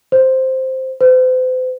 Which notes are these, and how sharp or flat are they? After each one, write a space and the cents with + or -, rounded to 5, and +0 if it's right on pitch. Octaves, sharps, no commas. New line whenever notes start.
C5 +0
C5 -40